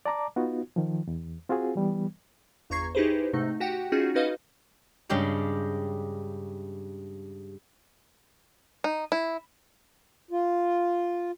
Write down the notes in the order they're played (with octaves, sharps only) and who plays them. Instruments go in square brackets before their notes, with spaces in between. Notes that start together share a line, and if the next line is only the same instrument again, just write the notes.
[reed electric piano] D5 A5 A#5 D6
B3 D#4 F4 F#4
D#3 F3
E2
C4 F4 F#4 G#4
E3 G3 B3
[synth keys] G1 E2 A#5 C#6 G#6 C7
D#4 E4 G4 G#4 B4 C5
G#2 C3 A3 D#4
F#4 G4 F#5 G5
C#4 D#4 F4 F#4 G#4
C#4 D#4 F#4 B4 D#5 F5
[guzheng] G2 C#3 G3 G#3 G4
[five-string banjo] D#4
E4
[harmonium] F4